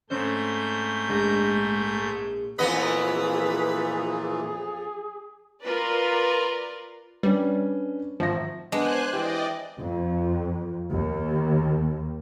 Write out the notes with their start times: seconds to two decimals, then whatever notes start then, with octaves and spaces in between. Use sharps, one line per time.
0.10 G#2 A3 C4 C#4 C5 G6
1.08 A#1 G#3 A#3 A#5
2.59 F2 A#2 E3 B3 G#4 B4 D#5
5.62 F4 A#4 B4 D5
7.23 G3 C#4 D4 B4
8.20 G#1 F3 E5 A#6
8.72 G#3 B3 D4 C5 G#5 F#6
9.13 E3 C4 G4 D5 D#5
9.80 F2
10.93 D#2